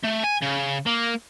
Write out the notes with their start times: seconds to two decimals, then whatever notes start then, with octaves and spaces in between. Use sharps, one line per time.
0.03 A3
0.23 G#5
0.42 C#3
0.86 A#3